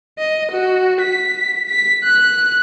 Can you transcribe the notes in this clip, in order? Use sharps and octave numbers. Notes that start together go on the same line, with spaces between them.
D#5
F#4
B6
B6
F#6